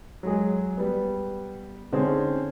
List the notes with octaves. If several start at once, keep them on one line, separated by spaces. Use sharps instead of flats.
F#3 G#3 G#4
G3 B3
D3 C4 C#4 D#4 G#4